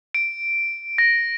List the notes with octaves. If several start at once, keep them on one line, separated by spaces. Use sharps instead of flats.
D7
A#6